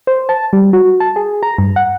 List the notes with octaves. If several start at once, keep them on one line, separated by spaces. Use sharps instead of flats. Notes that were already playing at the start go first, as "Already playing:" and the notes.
C5
A5
G3
F#4
A5
G#4
A#5
G2
F#5